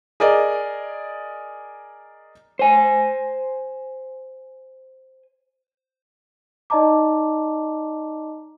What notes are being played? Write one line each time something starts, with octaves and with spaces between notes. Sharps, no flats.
G#4 A#4 D5 D#5
C5 G#5
D#4 D5 D#5 A5 A#5 D6